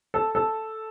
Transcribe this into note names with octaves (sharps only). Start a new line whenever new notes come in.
A4
A4